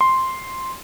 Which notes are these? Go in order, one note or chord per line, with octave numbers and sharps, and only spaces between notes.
C6